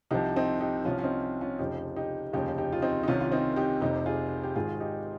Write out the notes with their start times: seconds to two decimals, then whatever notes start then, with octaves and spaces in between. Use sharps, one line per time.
0.11 C2 C3 F3 D#4 G4
0.36 C4 D#4
0.61 D#4 G4
0.85 C2 C3 F3 C#4 F4
0.98 C#4
1.04 C4 D#4
1.41 C#4 F4
1.59 F1 F2 C#3 F3 D#4 G4
1.96 D#4 G4
2.33 F1 D#2 C#3 F3 D#4 G4
2.58 D#4 G4
2.72 F4
2.82 C4 D#4
3.03 D#4
3.08 C2 C3 D#3 C#4 F4
3.20 F4
3.32 C4 D#4
3.56 D#4 G4
3.81 F1 F2 C3 D#4 G4
4.06 F4 G#4
4.43 G4
4.56 G#1 G#2 D#3 F4 G#4
4.80 D#4 G4